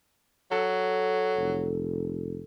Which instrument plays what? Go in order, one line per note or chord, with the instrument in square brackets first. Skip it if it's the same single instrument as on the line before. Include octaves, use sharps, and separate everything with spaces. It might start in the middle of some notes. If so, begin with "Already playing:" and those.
[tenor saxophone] F#3 [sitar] A4
[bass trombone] F1